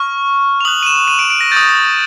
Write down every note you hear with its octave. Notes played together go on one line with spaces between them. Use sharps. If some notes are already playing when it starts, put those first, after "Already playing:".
Already playing: C#6 F6
F7
D#6 F#6 F#7
D#7
E7
D#7
D7
D7
A#6
D#6 G6 A6